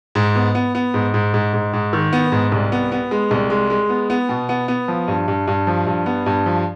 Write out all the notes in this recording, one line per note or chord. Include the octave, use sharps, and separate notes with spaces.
G#2
B3
B3
B3
G#2
G#2
G#2
G#2
G#2
D#3
B3
G#2
C2
B3
B3
G#3
C2
G#3
G#3
B3
B3
B2
B3
B3
F3
G2
G2
G2
F3
G2
B3
G2
F3